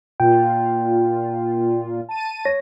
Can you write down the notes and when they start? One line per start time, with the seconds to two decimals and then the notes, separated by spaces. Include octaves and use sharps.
0.20 A#2 F4 G5
2.09 A5 D#7
2.45 C#5 A#6